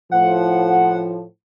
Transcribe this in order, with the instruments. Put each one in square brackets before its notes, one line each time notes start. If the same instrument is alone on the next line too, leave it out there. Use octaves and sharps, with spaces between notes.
[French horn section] A2 F3 [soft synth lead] F#5